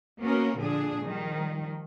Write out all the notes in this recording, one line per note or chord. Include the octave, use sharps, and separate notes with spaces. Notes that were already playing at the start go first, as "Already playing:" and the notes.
A#3 B3 C#4 F#4 A#4
A#2 D3 F3 D4 G#4
D#3 F3 G3